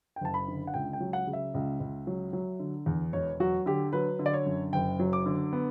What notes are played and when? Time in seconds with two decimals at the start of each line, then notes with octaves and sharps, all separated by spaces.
0.16 G5
0.21 F#1 A5
0.34 B5
0.48 D3
0.67 F#5
0.74 C#2 G5
0.93 G5
1.00 F#3
1.13 F#5
1.27 C#3
1.33 E5
1.54 C#2
1.80 C#2
2.07 F#3
2.33 F#3
2.60 D3
2.86 E2
3.13 E1 C#5
3.40 F#3 F#4
3.66 D3 G4
3.93 F#3 B4
4.19 D3
4.26 D5
4.33 C#5
4.46 F#2
4.73 F#1 G5
4.99 F#3
5.13 D6
5.26 D3
5.53 B3